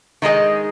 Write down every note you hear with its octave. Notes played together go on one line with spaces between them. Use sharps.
D#3 G#3 D#4 G#4 D#5